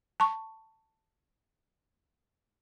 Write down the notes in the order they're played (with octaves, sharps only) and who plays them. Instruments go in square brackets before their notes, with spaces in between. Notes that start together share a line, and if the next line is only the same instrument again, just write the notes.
[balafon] A5 C#6